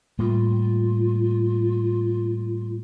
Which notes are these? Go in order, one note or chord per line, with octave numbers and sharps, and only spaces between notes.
A2 G3 A#3 F4